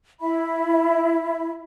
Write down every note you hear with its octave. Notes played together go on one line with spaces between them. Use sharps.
E4 E5 B5